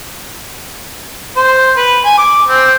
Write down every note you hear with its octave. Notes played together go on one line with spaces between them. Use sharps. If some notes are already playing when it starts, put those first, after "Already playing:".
C5
B4
G#5
D6
C4